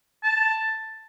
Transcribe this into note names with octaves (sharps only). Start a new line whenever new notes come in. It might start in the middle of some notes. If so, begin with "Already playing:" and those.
A5